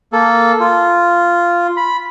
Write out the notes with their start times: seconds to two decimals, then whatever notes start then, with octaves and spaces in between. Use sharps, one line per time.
0.13 A#3 A4
0.60 F4
1.77 B5